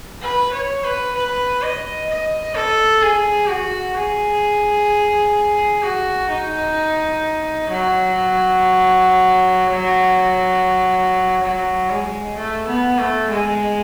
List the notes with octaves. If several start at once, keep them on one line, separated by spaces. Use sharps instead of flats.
B4
C#5
B4
B4
D#5
D#5
A4
G#4
F#4
G#4
F#4
D#4
F#3
F#3
G#3
A3
B3
A3
G#3